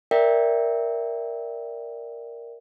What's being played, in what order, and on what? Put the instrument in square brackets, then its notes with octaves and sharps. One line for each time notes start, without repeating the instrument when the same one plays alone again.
[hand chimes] A#4 D5 E5 G5